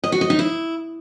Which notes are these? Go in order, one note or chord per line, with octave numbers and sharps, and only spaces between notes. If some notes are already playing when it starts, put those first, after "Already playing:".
D#5
F#4
D#5
D#4
E4